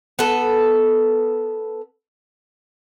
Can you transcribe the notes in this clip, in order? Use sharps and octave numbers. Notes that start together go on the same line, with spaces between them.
B3 A4